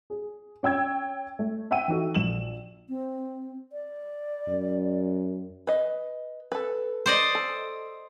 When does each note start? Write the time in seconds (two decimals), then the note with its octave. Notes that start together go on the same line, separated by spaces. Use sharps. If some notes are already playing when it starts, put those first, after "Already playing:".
0.10 G#4
0.63 C#4 G5 E6 G#6
1.39 A3
1.71 E5 F#5 G5 E6 D#7
1.88 E3 D#4 F#4 A4
2.14 A#1 E7 F#7
2.89 C4
3.72 D5
4.48 F#2
5.67 B4 D#5
6.52 A4 B4
7.06 C5 D5 D#5
7.35 A4